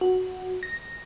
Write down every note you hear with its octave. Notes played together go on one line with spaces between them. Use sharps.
F#4
A#6